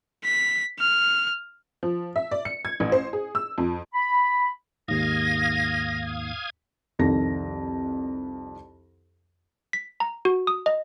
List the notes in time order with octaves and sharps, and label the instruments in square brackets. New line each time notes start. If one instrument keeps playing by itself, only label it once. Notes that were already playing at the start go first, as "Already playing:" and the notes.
[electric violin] B6
F6
[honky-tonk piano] F3
E5
D5
C#7
G#6
A1
C5
G#4
E6
F2
[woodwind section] B5
[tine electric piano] D#2 G#2 [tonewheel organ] F5 D#6 G#6 [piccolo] A#6
[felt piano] C2 F2 D#3 A#6
[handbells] B6
A#5
F#4
D#6
D#5